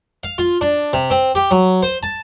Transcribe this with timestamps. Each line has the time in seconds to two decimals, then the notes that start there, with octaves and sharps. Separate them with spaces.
0.23 F5
0.38 F4
0.61 D4
0.93 C3
1.10 C4
1.35 G4
1.51 F#3
1.83 C5
2.03 A5